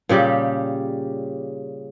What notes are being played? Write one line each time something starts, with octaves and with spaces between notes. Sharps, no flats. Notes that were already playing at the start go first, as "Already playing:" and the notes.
A#2 C#3 G3 G4